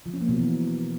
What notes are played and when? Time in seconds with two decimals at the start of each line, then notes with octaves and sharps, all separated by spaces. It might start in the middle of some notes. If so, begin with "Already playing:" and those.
0.06 F3
0.13 C#4
0.21 A#3
0.29 B2
0.36 E3